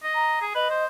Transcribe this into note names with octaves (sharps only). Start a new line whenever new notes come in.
D#5
A#5
G#4
B4 D#5
C5